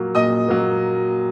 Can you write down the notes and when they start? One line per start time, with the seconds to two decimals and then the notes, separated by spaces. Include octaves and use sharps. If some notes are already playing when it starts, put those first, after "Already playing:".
Already playing: A#2 F#3 A#3
0.15 A#2 D#5 D#6
0.48 F#3 A#3